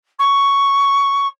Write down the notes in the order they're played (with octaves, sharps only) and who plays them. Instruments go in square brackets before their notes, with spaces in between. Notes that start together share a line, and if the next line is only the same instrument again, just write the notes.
[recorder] C#6